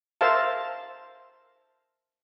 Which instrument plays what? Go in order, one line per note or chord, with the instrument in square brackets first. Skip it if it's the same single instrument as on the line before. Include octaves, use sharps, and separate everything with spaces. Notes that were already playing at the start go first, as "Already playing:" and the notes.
[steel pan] A#4 C5 E5 F5 A5